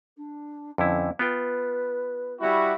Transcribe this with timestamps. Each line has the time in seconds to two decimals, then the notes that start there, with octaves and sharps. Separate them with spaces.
0.17 D4
0.78 F2 D3 C#4 E4
1.19 B3 F4 B4 G5
2.40 G3 E4 F#4